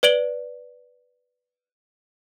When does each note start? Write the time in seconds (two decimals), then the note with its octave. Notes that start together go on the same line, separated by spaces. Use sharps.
0.03 B4 D5 D7 F#7 G7